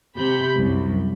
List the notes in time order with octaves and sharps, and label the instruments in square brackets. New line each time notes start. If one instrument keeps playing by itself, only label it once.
[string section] C3 G4 B5 G6
C2 F#2